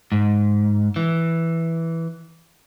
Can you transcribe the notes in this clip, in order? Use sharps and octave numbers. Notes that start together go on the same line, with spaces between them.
G#2
E3